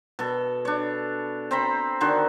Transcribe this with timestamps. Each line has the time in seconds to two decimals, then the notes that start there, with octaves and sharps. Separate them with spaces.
0.19 B2 A4
0.65 D4 C#5
1.51 C4 C5 A#5 B5
2.01 D3 D#3 F#4 C5